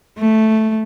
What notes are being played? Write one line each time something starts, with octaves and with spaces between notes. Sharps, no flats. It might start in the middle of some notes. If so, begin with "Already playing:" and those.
A3